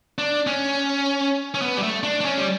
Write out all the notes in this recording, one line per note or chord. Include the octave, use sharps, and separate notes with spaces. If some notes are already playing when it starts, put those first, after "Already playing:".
D4
C#4
C#4
B3
G3
A3
D4
D4
C#4
G3